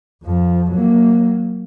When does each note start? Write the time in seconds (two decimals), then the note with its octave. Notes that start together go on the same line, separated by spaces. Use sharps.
0.23 F2 F3
0.71 F#3 A#3